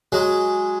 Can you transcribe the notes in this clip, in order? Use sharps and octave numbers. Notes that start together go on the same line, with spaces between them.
F#3 G#3